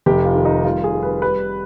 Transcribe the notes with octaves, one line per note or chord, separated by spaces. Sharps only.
F1 G4
F4
D#3
D#4
G3 F4
G#4
G3
B4
G3 B4